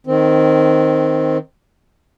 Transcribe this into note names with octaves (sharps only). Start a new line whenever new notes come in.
D#3 C4